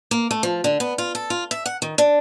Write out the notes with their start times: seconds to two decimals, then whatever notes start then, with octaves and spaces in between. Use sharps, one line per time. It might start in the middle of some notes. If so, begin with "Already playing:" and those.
0.11 A#3
0.31 A3
0.43 F3
0.64 D3
0.80 B3
0.98 F4
1.15 A4
1.30 F4
1.51 E5
1.66 F#5
1.82 D#3
1.98 D4